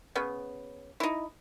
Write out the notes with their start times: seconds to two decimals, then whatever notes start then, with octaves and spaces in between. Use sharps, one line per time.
0.15 C#3 B3
1.00 D#4 E4